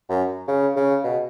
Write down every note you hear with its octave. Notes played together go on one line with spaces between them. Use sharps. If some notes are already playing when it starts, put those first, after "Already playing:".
F#2
C#3
C#3
B2